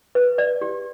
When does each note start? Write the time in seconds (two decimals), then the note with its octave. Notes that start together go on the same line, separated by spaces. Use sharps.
0.15 B4
0.38 D5
0.61 G4